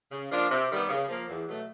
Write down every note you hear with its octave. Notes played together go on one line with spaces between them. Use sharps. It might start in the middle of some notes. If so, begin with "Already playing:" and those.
C#3
F3 A#3 D4 F4
C3
D#3 G3 B3
C#3
F3 A#3
E2
B2 F#3 A3